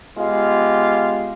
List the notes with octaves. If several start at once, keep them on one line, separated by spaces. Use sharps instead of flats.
G#3 B3 F4 G4 F5